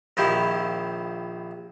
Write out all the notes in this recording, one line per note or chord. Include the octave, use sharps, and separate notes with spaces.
A#1 D#3 F3 E4 G4